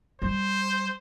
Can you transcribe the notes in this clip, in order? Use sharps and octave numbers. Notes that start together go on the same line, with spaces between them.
G3 C5